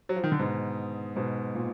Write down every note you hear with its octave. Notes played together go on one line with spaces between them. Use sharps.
F#3
F3
D#3
D3
G#2 B2
G#2 B2
A#2